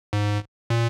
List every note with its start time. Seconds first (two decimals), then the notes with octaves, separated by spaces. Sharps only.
0.13 G#2
0.70 A#2